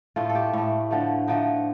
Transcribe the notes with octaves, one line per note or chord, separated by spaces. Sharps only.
A2 A3 F4
A4
G4
A2 A3
D3 F3 A3
D3 F3 A3 D#4